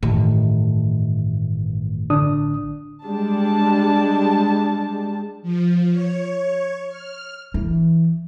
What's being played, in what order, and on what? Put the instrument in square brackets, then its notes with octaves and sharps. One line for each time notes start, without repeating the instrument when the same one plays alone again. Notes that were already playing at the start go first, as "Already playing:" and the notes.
[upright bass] A1 [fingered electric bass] G2 D#3 A3
[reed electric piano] D3 D4 D#6
[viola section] G3 G#3 D4 A5
[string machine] F3
C#5
F6
[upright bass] E3